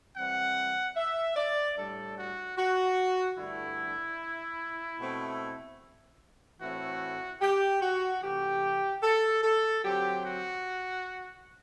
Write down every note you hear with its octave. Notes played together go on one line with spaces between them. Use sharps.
E3 G3 C4 F#5
E5
D5
A2 G3 D4 A4
F#4
F#4
G2 D3 A3 D4 E4
B2 A3 C4
A2 E3 A3 C4 E4 F#4
G4
F#4
C3 E3 A3 G4
A4
A4
D3 F#3 C4 G4
F#4